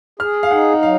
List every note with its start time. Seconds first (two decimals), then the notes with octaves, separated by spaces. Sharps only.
0.19 G#4 F6
0.43 F5
0.51 D#4 F#5
0.73 F#5
0.83 F#3 F5